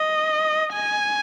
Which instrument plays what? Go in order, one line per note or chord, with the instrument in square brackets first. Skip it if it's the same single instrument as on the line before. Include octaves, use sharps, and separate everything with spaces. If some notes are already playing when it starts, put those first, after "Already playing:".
Already playing: [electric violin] D#5
G#5